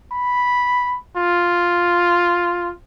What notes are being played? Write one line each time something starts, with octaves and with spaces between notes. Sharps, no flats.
B5
F4